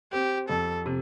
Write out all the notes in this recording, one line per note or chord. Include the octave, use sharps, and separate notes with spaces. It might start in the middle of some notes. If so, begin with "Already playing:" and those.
C4 G4
F2 A4
C3